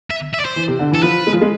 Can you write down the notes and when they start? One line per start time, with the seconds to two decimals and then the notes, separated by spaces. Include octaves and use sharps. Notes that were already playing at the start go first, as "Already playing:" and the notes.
0.10 E5
0.34 E5
0.40 D5
0.45 C5
0.56 E3
0.68 C3
0.79 D3
0.91 E3 A4
1.03 F3 B4
1.27 G#3
1.33 F3
1.41 G#3